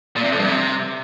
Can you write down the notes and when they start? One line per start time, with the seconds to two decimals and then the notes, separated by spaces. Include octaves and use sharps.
0.16 A#2
0.24 C3
0.32 F2
0.39 G2
0.47 C3